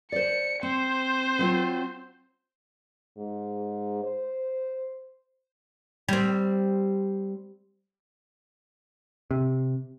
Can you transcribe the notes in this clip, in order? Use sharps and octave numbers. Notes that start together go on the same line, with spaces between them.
C5 D5 C#7
C4 C5
F#3 C4 F4
G#2
C5
G3 C4
C3